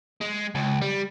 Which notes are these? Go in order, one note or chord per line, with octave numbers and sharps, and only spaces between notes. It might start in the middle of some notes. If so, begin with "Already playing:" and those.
G#3
C#2
G3